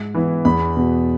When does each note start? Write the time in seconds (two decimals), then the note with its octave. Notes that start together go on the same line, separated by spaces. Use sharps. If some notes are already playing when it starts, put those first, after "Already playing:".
Already playing: G#2
0.14 E3 B3 E4
0.45 E2 B5
0.76 B2 B3